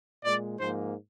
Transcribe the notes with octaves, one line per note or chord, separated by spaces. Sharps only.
A#2 G#3 D5
G#2 F3 A#3 C5